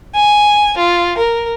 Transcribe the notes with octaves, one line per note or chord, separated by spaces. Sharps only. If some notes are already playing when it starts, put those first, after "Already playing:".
G#5
F4
A#4